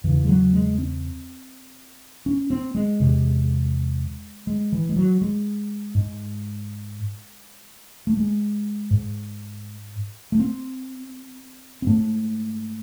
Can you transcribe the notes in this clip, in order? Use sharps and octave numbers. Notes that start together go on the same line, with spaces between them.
E2 C#3 E3
G#3
F#3
G#3
C4
C#4
C4
G#3
E2 C3
G#3
E3
G#3
F#3
G#3
G#2
A3
G#3
G#2
A3
C4
C4
G#2 A3